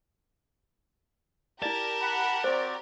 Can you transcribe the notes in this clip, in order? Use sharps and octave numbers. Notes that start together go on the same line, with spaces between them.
E4 G4 A#4 D5 A5
F#5 B5
C4 F#4 C5 D5